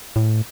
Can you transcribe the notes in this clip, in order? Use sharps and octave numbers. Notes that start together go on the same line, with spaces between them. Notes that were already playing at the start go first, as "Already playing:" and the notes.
A2